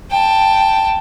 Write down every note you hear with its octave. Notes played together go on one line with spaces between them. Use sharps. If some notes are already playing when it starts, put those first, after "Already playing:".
G5 A5